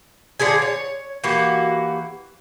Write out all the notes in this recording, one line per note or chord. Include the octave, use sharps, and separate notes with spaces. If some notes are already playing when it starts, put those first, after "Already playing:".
D3 F3 G#4 G#5
C#5
E3 A#3 F#4 G4